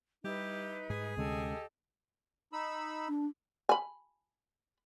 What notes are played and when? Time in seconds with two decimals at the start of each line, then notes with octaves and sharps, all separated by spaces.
0.24 G3 D#4 E4 G4 B4
0.90 G#2 G#4
1.17 D2 C3 G#3 C#4 G4 A4 D#5
2.53 D#4 B5 E6
3.08 D4
3.69 G#5 B5